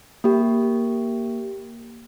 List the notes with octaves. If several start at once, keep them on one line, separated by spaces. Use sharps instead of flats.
A#3 G4